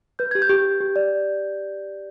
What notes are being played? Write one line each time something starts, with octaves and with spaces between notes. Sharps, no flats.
B4 G6
G4 G#6
G6
G4
G4
G4
D5